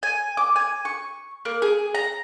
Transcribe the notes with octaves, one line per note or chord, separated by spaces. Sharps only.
G#5
D6
G#5
C#6
A#3
G#4
A#5